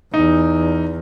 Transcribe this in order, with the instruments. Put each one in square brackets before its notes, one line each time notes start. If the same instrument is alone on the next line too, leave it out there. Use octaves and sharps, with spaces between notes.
[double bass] E2 [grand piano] D#4